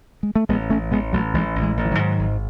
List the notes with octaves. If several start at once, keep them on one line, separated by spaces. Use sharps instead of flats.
G#3
A3
A1 G#3 B3
A1 A3 C#4
A1 G#3 B3
A1 F#3 A3
A1 E3 G#3
A1
E3 G#3
A1
E3
D#3 F#3
G#2
G#1